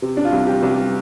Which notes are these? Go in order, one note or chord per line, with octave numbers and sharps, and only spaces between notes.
C3
D4
F4
C2
G4
C2
G4